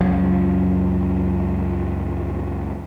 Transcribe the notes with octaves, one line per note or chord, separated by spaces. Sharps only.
C#2 F#2 F3 F#3